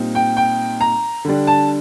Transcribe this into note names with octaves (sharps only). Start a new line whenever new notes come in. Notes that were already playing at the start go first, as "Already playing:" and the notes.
Already playing: A#2 G3 C4 D#4
G5
G5
A#5
D3 G3 D4
A5